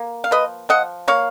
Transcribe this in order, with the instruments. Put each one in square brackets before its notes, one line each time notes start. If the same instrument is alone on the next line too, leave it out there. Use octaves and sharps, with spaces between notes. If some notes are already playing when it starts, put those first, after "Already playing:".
Already playing: [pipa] A#3
F5
F3 B4 D#5
F3 D#5 F#5
A#3 C#5 F5